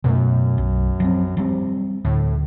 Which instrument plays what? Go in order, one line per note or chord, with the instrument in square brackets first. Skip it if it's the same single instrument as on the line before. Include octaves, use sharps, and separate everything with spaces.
[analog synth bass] F#2 [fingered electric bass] B2 A3
[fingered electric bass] B1
F3 F#3 C4
F3 G3 C4
[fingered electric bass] D2 [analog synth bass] A2